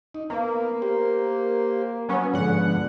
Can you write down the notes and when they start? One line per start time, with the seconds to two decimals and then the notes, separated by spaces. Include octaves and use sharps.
0.15 D#4
0.30 A#3 B3
0.82 G4 C5
2.09 F#3 B3 C#4
2.34 G#2 D3 F3 B3 F#5